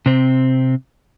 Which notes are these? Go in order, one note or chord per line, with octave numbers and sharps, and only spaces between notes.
C3 C4